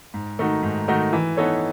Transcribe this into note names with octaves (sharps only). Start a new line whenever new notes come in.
G#2
D#3 A3 D#4 F#4
G#2
D#3 A3 D#4 F#4
E3
B3 D#4 A4 C#5